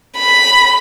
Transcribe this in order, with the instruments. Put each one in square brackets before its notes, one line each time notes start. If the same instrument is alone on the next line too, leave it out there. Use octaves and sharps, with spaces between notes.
[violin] B5